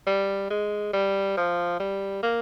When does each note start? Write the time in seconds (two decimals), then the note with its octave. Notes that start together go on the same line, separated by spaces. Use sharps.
0.07 G3
0.50 G#3
0.93 G3
1.37 F3
1.80 G3
2.23 A#3